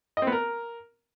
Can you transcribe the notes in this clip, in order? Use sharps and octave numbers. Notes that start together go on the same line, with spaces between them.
D#5
C4
B3
A#4